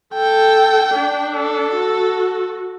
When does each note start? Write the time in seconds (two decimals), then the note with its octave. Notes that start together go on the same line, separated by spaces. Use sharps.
0.14 A4 G5
0.95 D4
1.35 A4
1.75 F#4